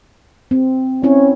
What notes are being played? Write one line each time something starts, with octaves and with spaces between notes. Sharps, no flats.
C4
C4 C#4 E4 C#5